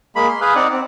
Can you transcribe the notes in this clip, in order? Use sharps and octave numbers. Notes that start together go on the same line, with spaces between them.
G#3 A#3 B5
C6
G#4 B4 F5
C4 D#4 D5 F#5
C4